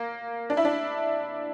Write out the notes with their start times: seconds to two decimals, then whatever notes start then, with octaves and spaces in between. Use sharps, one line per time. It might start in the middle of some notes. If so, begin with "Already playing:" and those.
Already playing: A#3
0.50 D4
0.57 E4
0.65 D4